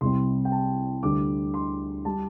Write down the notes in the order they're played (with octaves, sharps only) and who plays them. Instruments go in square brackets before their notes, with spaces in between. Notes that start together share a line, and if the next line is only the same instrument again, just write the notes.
[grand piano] C2 C3 G3 C6
G5
A5
D2 D3 G3 D6
C6
G3 A5